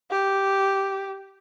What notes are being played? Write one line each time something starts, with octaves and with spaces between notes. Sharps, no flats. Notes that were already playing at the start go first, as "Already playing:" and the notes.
G4